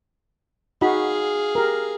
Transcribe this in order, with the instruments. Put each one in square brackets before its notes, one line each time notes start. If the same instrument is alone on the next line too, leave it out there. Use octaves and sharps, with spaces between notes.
[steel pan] D#4 F#4 B5 [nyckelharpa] G#4 F5
[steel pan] G4 A#4